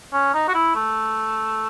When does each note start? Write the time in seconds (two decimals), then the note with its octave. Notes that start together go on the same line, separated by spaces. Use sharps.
0.13 C#4
0.34 D#4
0.48 F#4
0.54 E4
0.75 A3